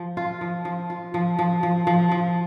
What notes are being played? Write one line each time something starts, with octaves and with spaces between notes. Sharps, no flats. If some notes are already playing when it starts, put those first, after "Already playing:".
Already playing: F3
F4
F3
F3
F4
F3
F3
F3
F3
F3